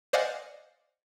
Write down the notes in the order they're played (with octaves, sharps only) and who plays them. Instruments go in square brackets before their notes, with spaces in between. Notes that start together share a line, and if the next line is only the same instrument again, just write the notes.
[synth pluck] C5 D5 D#5 F5 F#5 G#5